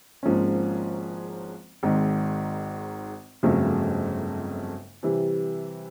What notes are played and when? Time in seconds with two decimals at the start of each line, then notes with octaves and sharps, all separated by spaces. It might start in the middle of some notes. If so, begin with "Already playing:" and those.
0.23 G#1 G#2 F3 A#3 C#4
1.83 G#1 G#2 D#3
3.43 G1 F2 C#3 F#3 A3
5.03 C3 E3 G3